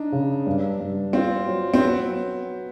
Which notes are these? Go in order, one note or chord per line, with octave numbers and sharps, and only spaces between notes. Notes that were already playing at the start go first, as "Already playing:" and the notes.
Already playing: D4 D#4
C#3
G2
G2
C4 F4
F#3
C4
F#3 B3